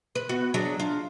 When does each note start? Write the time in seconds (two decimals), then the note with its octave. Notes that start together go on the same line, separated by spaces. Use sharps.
0.15 B4
0.29 B3 F#4
0.54 F#3 D4 G#4
0.80 D4 F4